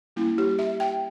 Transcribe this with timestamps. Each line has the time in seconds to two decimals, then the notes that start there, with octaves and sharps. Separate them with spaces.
0.16 G3 A#3 C#4 E4
0.38 G4
0.59 E5
0.80 G5